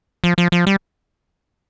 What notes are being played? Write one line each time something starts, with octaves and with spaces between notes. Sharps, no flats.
F3
F3
F3
G3